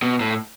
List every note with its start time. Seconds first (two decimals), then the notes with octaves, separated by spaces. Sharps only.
0.02 B2
0.20 A2